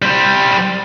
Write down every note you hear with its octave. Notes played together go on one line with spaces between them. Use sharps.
G3 C5